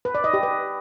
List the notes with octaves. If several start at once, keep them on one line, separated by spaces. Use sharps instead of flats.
B4
D5
D#5
G4
B4